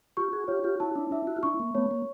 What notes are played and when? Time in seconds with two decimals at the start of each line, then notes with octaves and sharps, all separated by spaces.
0.17 F4 G4 C#6
0.33 F#4 G#4
0.48 F4 G4 C#5
0.64 F4 G4
0.80 E4 F#4 A5
0.96 D4 E4
1.11 D4 E4 E5
1.27 E4 F#4
1.36 F4
1.43 D4 E4 C#6
1.60 A#3
1.75 A3 B3 C#5
1.91 A#3